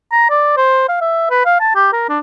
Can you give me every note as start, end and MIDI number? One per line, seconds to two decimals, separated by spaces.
0.12 0.30 82
0.30 0.55 74
0.57 0.87 72
0.89 0.97 77
1.01 1.29 76
1.30 1.43 71
1.45 1.56 77
1.60 1.73 81
1.75 1.87 67
1.92 2.07 70
2.09 2.19 62